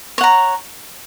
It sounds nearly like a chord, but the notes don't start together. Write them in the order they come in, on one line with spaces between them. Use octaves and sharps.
C#5 F#5 A#5